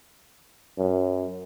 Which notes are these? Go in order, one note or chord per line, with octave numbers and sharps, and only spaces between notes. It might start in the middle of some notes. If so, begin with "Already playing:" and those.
F#2